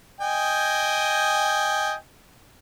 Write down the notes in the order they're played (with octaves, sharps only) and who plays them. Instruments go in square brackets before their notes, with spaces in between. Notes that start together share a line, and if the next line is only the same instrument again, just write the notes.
[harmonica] D#5 G5 G#5